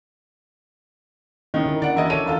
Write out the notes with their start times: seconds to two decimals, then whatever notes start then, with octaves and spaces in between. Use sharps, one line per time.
1.54 D#3 C#4 E4 D#5
1.66 D3 A#4
1.82 D3 D5 F#5
1.96 E1 E4 D#5
2.09 D3 A4 C#5 D5 D#7
2.26 E1 F4 A4